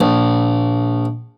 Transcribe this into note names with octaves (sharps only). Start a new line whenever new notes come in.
A#1